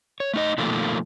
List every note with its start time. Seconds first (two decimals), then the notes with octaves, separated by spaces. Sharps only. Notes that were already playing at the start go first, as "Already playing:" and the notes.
0.20 C#5
0.34 A3 D#4 D#5
0.58 B2 D#3 F3 A3 A#3